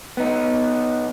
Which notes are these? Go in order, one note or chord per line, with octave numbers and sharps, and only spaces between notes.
B3 D#4